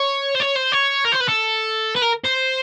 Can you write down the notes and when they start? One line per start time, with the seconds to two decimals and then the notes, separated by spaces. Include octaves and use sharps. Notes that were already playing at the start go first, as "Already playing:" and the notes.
Already playing: C#5
0.35 C5
0.40 C#5
0.56 C5
0.72 C#5
1.05 A#4
1.12 C5
1.21 B4
1.29 A4
1.96 B4
2.02 A#4
2.25 C5